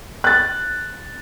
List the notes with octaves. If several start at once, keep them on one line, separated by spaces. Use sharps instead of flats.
F#6 A6